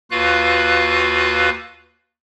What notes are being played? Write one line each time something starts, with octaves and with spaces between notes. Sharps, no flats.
D#2 F4 F#4 B4 F5 F#6